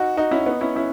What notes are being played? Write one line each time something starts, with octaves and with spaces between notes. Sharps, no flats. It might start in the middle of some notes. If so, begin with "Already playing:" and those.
Already playing: D#4 F#4
D#4 F#4
C#4 E4
B3 D#4
C#4 E4
C#4 E4